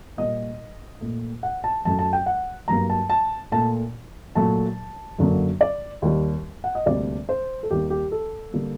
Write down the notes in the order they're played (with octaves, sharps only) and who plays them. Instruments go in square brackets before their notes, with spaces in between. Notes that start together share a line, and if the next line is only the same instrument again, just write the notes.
[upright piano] A#2 G3 A#3 D#5
A#2 A3
F#5
A5
F#2 F#3 A3 A5
A5
G5
F#5
G2 F#3 A#3 A#5
A5
A5
A#2 A3 A5
A#2 F#3 A3 A5
F#2 D3 F#3 A#3
D5
D#2 D#3 G3
F#5
D#5
D2 C3 G3 A#3 D5
C5
A4
D#2 D#3 G3 A#3 G4
G4
A4
D3 G3 A#3